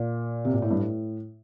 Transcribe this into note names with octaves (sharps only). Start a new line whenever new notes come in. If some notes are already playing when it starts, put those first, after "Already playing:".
Already playing: A#2
C3
A#2
A2
G2
A2